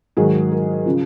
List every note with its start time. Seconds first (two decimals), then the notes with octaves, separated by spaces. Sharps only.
0.17 G#2 D#3 F#3 G#4
0.51 A#4
0.86 C#3 F3